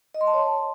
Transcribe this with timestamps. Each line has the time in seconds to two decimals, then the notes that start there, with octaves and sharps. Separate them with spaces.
0.14 D#5
0.21 C6
0.27 A5
0.34 C#5